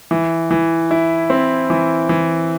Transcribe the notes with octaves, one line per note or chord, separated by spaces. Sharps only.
E3
E3
E4
C4
E3
E3